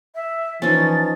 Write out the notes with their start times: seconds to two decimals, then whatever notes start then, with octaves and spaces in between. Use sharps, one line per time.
0.15 E5
0.62 E3 F3 C#4 D#4 A6